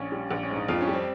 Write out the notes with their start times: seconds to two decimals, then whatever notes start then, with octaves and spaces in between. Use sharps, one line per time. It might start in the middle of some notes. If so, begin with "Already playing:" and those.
Already playing: A#1 C#4
0.12 G3
0.31 A#1
0.43 C#4
0.50 G#2
0.56 D#4
0.68 F2 F4
0.81 C#4
0.87 G3
0.93 C4